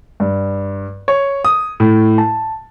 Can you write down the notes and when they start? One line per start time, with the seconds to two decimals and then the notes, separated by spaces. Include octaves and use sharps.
0.20 G2
1.08 C#5
1.45 D#6
1.80 A2
2.18 A5